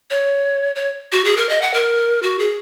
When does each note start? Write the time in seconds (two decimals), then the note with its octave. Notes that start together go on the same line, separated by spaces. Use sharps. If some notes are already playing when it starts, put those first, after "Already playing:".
0.10 C#5
0.76 C#5
1.12 F#4
1.25 G#4
1.37 A#4
1.49 D#5
1.62 F#5
1.74 A#4
2.23 F#4
2.39 G#4